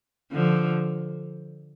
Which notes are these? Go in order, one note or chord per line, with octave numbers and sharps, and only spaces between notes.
D3 F3